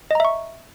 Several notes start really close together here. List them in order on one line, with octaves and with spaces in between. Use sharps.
D#5 A#5 E5 C#6